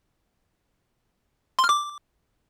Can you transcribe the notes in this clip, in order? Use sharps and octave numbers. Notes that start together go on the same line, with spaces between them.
C6
F6
D6